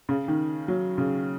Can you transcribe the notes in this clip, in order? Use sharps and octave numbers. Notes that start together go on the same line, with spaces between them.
C#3
D#3
F#3
C#3